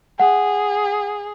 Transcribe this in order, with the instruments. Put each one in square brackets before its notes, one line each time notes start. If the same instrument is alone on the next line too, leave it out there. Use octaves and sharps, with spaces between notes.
[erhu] G#4 [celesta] F#5